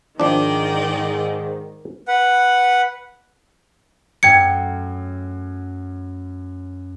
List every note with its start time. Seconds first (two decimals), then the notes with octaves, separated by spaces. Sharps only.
0.20 G#2 D#3 F3 D4 D5 D#5 G5
2.08 B4 F#5
4.23 F#2 A3 G5 G#6 C#7